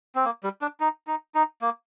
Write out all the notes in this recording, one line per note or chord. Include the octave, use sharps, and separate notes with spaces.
C4
A#3
G3
D4
D#4
D#4
D#4
A#3